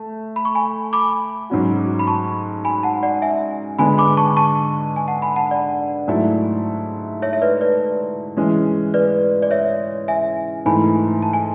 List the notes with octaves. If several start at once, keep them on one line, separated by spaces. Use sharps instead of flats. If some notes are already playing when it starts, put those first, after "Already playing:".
Already playing: A3
B5
C#6
G#5 B5
B5 D6
G#2 F#3 C#4 F#4
B5
A5 C#6
G#5 B5
F#5 A5
D5 F#5
E5 G#5
D3 G#3 B3 D4 G#5 B5
B5 D6
A5 C#6
A5 C#6
G#5
F#5 A5
G#5 B5
F#5 A5
D5 F#5
G#2 F#3 A3 E4 A4
C#5 E5
E5
B4 D5
B4 D5
E3 G#3 C#4
B4 D5
D5
C#5 E5
E5 G#5
G#2 E3 A3 E4 G#5 B5
A5
G#5